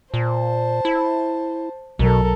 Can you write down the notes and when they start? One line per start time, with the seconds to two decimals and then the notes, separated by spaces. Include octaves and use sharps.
0.14 A#2 C5 A5
0.85 E4
1.99 B1 B2 F#3 A4 A#4